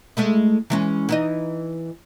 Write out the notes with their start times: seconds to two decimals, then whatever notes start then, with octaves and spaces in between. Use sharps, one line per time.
0.17 G#3 A3 E4
0.70 E3 G#3 C#4
1.09 E3 D#4 D#5